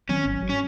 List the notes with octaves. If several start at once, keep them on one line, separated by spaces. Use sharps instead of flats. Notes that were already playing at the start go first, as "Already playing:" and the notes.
D#3 F#3 C4 C#4
G#1
F#3
C#4